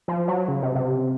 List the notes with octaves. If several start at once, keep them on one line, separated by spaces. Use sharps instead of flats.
F3
F#3
C#3
C3
C3